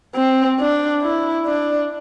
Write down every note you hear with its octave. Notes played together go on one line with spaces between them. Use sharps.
C4
D4
E4
D4